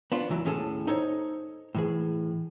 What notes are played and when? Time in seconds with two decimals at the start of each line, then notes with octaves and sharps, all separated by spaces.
0.12 B3 D4 F4
0.29 C#2 E3 F#3
0.44 D#2 A2 C#4 G#4 A4 A5
0.87 D#4 A4 C5 C#5
1.75 A2 E3 G#4